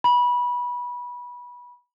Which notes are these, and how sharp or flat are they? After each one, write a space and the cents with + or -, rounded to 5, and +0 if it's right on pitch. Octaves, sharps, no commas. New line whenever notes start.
B5 -20